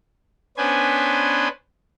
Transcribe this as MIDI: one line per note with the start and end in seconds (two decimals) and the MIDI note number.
0.57 1.48 59
0.57 1.48 61
0.57 1.48 62
0.57 1.48 71
0.57 1.48 72
0.57 1.48 80